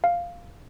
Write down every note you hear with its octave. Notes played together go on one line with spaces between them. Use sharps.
F5